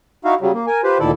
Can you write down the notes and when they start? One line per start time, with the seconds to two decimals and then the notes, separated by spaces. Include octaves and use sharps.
0.25 D#4 E4 F#4 F5
0.41 C#3 F#3 G3
0.54 A#3
0.67 A#4 G#5
0.84 F4 G4 B4 C5
1.00 D2 A#2 D#3 E4 A4 D5